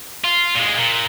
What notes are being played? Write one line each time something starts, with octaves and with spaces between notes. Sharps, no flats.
F4
A#2 G#3
A#2